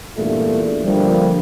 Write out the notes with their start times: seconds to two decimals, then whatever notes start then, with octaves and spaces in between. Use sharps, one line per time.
0.17 E2 G2 A#2 A3
0.84 D3 F3 G3 A#3